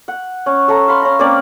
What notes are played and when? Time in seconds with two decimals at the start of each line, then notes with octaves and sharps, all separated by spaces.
0.08 F#5
0.46 C#4
0.68 A4 C#5 E5 A#5
0.88 F5 B5 C6
1.02 C#4 A#5
1.19 A#3 C4 C#4 D5